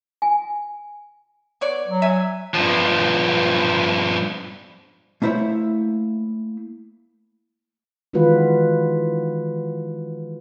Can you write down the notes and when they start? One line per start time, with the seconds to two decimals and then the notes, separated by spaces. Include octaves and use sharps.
0.22 G#5
1.61 B3 C#5 D5
1.87 F#3
2.02 E5 G#5
2.54 G2 F3
5.22 A3 A#3 E4 C5 C#5 E5
8.13 D#3 E3 G#3 F4 F#4 B4